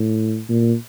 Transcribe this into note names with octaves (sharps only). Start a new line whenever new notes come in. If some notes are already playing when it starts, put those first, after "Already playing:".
Already playing: A2
A#2